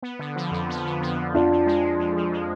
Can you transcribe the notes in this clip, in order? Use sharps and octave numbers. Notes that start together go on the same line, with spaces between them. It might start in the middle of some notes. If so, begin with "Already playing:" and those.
B3
D3
F3
F2
B3
D3
F3
F2
F2 D4 F4
F3
G#3
F2
F2
F3
G#3